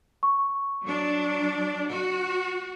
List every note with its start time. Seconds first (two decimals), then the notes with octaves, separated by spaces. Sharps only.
0.23 C#6
0.84 F#3 D4
1.91 F#4